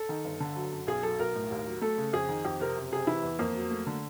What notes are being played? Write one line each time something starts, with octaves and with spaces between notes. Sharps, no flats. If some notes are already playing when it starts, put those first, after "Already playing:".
Already playing: A4
D#3
G1
D3
F#3
F#2
B1 G#4
F#3 A4
B1 A#4
A2
D#2
F#3
A3 A4
C#3
F2 G#4
D#3
F2 G4
C3 A#4
F#1
C3 G#4
E3 E4
E2
F2 A#3
F#3
A3
D3